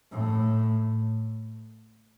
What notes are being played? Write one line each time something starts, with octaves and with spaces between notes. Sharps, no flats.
A2